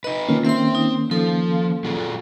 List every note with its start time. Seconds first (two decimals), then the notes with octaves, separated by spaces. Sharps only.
0.04 D#4 B4 D#5
0.29 D#3 A#3 C#4 F4
0.45 C4 C5 E5 C6
0.75 D#4
1.11 F3 A4
1.84 F#3 F4 G#4